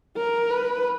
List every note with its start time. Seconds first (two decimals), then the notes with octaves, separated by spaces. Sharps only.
0.17 A#4
0.51 B4